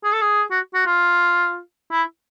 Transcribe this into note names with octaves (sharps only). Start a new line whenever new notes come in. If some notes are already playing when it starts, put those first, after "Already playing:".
G#4
A4
G#4
F#4
F#4
F4
E4